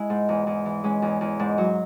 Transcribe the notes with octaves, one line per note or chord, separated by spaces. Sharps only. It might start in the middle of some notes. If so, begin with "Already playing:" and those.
Already playing: G#3 E4
G#2
E2
E2
E3
G#3 C#4
E2
E2
G#2
F#3